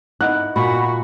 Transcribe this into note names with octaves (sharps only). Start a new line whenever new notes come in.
D#4 E4 F#5 F#6
A#2 F#4 B5